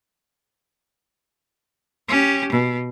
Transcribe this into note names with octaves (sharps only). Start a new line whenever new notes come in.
C#4 G4
B2